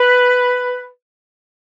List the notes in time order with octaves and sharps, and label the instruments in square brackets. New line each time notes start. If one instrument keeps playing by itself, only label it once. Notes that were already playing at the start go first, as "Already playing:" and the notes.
Already playing: [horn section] B4